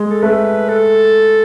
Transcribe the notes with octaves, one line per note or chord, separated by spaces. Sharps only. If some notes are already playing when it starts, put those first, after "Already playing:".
Already playing: G#3
A4
A3 B4
A4